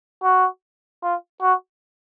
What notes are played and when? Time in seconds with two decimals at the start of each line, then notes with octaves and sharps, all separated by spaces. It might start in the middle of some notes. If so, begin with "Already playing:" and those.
0.23 F#4
1.03 F4
1.42 F#4